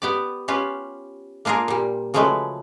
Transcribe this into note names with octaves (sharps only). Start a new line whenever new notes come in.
B3 G4 D5
C#4 F4 G4 B4
A#3 D4 F4 G#4 A#4
A#2 G3
C#3 F3 F#3 G#3 A3 B4